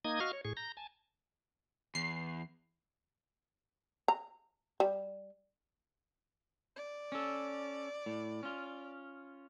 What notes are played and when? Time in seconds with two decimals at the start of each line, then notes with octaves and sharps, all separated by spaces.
0.05 A#3 D#4 D#5 D#6 G#6
0.20 F#4 D#5 F5 C#6 F6
0.33 C#5
0.45 A2 G#4 C#6
0.57 A#5 G6 A#6
0.77 G#5 A5
1.95 E2 C7
4.08 A#5
4.80 G3
6.76 D5
7.12 C#4 A4
8.06 A2
8.43 C#4 F4